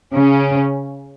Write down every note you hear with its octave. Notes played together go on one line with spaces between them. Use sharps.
C#3 C#4